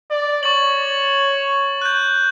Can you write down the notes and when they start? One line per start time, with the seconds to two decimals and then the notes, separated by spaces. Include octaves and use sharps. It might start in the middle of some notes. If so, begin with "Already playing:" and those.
0.11 D5
0.43 C#5 C#6 A6 F#7
1.81 F#6 G6